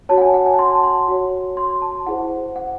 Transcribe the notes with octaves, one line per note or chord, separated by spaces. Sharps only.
F#4 C#5 A5
F#5
G#5
F#5
G#5
A5
C6
A5
C6
F#4 C#5
C6
A5
E4 G#4 C5 F#5
F#5